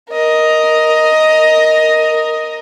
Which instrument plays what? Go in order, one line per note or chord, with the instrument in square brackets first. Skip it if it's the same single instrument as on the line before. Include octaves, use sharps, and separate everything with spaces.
[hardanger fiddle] A#4 D#5